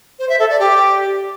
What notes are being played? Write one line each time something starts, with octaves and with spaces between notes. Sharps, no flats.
C5
E5
A4
D5
G4